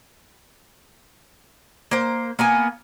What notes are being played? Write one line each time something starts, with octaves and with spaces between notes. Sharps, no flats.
A#3 C5
A#3 B3 G#5